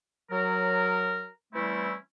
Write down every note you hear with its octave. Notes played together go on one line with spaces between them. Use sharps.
F#3 A#4
E3 G3 A3 C4 C#4 E4